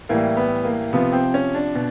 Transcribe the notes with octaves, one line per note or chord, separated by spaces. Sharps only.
A2 E3 G3 A#3
B3
A#3
C3 F3 B3
C4
C#4
D4
B2